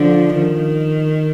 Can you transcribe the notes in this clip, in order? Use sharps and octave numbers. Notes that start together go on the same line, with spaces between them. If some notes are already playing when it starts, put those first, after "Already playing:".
Already playing: D3 F3
D#3